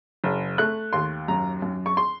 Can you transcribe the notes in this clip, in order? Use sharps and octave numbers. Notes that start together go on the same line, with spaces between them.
F#1
A3 F#6
D#2 C6
F#2 A#5
F#2
C#6
C6